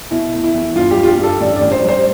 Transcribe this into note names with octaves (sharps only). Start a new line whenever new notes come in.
B2 E4
A3
E4
E2
G2 F4
G4
G3
F4
G4
G2
A4
A1 D5
A1 D5
C5
G3
C5